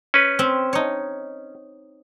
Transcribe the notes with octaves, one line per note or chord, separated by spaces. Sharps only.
C#4 B4
C4
D#4 C#5